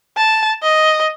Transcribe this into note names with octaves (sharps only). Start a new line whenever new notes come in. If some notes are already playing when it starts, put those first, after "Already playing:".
A5
D#5